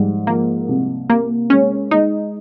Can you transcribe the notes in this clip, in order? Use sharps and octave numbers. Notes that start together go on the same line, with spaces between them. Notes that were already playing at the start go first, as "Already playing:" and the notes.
Already playing: G#2 F3 G3
F3 A#3
C2
C3 A#3
G#3 C#4
G#3 D#4